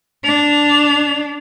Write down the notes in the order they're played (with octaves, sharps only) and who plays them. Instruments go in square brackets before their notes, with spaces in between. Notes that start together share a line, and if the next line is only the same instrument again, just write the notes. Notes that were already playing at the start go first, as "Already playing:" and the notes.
[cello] D4 [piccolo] F7